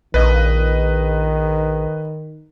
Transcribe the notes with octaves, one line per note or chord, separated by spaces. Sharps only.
A#1 D#3 B4 D#5